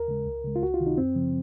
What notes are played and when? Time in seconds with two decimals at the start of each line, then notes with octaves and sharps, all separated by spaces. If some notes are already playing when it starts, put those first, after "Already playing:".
Already playing: D#2 A#4
0.08 C#3 G#3
0.26 C#2
0.45 C#3 G#3
0.56 F4
0.63 C#2 F#4
0.74 F4
0.80 C3 D#3
0.87 D#4
0.98 F#2 C4
1.16 C#3 F3